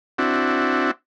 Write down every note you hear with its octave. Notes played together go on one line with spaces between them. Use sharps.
C4 D4 E4 F#4